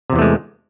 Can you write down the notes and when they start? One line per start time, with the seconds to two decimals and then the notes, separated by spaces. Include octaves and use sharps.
0.10 C3
0.13 E2
0.16 E3
0.19 A3
0.22 G#3